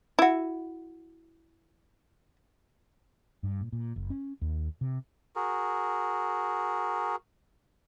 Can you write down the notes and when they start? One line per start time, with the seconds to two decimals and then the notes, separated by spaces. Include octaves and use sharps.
0.19 E4 F#4
3.43 G2
3.61 A#2
3.73 A#2
3.96 F#1
4.10 C#4
4.41 D#2
4.81 C3
5.36 F#4 G#4 A#4